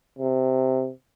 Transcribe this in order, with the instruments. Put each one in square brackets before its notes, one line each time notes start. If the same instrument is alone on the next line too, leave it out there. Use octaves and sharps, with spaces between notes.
[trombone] C3